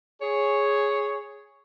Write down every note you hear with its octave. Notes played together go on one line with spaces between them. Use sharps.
G#4 C#5